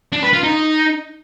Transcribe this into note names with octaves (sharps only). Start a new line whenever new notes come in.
D4
B4
F4
D#4